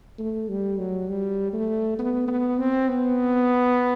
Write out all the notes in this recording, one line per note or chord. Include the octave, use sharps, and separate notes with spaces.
A3
G3
F#3
G3
A3
B3
B3
C4
B3